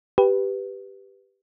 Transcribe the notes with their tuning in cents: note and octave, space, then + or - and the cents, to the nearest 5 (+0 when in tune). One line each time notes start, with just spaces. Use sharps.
G4 +0 B4 +0